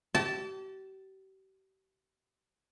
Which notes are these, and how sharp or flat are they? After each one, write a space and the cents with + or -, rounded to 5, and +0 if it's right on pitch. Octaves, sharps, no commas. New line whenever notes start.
G4 -40 A5 +0